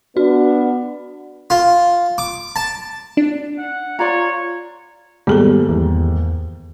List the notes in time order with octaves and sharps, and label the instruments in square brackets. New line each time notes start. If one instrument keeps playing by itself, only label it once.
[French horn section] B3 D4 [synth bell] F#4
[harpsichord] F4
D6
A5
[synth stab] D4
[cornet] F#5
[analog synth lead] F4 [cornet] C#5 [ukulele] D5 A#5
[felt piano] D#2 G#2 [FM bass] G3 [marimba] B3 G#4 A4
[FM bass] E2